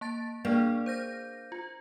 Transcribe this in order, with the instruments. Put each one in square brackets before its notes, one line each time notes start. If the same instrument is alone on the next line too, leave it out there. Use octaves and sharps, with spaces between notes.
[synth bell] A#3 A5 A6
[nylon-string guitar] A#3 [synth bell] D4 G#4 D5
[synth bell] C5 G6 A#6
F4